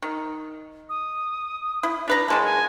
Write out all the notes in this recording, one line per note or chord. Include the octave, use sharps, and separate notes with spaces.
D#3
D#6
E4
D4 B4 A#5
F#3 G#3 A#3 A5
G#5